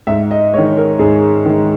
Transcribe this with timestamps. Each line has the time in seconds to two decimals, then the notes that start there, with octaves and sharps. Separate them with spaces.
0.07 G#2 E5
0.31 D#5
0.54 D#3 G#3 C#5
0.77 A#4
0.99 G#2 G#4
1.45 D#3 G#3